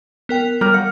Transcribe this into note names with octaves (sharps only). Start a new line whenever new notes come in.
B3 A#4 G5
G3 A#4
F#5